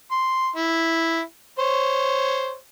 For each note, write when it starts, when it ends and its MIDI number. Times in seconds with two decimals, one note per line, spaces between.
0.11 0.49 84
0.56 1.21 64
1.59 2.56 72
1.59 2.56 73